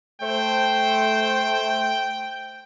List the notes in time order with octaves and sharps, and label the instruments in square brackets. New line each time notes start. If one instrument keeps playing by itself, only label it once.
[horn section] A3 C5 [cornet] G5